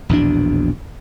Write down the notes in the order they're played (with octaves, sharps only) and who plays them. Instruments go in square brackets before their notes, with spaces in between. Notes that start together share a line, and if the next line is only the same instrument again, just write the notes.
[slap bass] A#1 E2 B2 D4